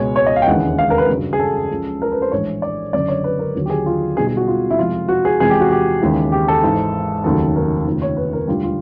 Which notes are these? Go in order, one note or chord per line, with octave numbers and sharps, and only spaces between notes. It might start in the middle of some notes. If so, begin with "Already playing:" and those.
Already playing: C#2 B2 G#3 C#5
C#5
D#5
F5
G5
E1 D#2 C#3 E3 G#3 F#5
F5
A#4
B4
G1 F#2 C#3 F#3
G#4
A4
C#2 C#3 F3 G#3
A#4
B4
C5
A#1 A2 E3 G#3 C#5
D5
F#1 F#2 D3 D5
C#5
B4
A#4
D#2 D3 F#3
G4
G#4
F4
B1 B2 G3 G#4
G#4
F#4
F4
E4
F2 C3 F3 G#3 F4
F#4
G#4
E2 C3 F3 G#3 G#4
G4
F#4
G4
D#2 C#3 E3 G#3
G4
A4
G#1 G#2 E3
F1 D#2 C#3 F#3 A4
A#4
F1 D#2 C#3 F3
C#5
B4
A#4
E1 D2 D3 G3 F4
F4